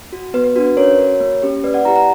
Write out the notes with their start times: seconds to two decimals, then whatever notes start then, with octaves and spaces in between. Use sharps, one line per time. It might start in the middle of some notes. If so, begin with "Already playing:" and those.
0.13 F#4
0.34 B3 B4
0.44 B4
0.56 D4 F#4 B4
0.67 B4
0.77 C#4 A#4 C#5
0.98 F#4 A#4 C#5
1.20 A#3
1.42 C#4 G4
1.64 A#3 B4 D5
1.74 D5 F#5
1.85 E4 G4 F#5 A#5
1.96 F#5 A#5